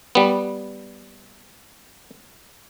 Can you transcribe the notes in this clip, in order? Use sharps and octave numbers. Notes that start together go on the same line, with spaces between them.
G3 B3